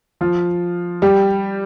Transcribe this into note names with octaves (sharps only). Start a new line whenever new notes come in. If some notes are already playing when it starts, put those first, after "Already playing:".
F3 F4
G3 G4